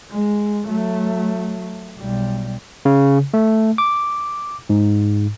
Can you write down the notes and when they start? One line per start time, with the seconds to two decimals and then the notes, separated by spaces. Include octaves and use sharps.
0.12 G#3
0.66 F#3 A3
1.98 B1 G3
2.85 C#3
3.34 A3
3.78 D6
4.70 G#2